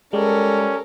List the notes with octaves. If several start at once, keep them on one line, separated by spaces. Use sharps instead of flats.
G3 G#3 C#4 A4 A#4